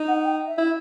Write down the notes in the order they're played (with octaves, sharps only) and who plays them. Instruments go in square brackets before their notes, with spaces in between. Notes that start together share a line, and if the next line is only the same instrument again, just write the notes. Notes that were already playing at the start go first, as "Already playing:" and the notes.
Already playing: [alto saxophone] D#4
[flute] F#5
G5
E5
[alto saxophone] E4